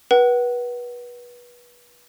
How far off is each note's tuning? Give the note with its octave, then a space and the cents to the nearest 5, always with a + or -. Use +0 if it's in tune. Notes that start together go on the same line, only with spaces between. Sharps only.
B4 -25 F#5 +30